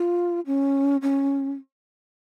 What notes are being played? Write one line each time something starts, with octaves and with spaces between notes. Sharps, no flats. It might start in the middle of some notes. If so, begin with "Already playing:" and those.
Already playing: F4
C#4
C#4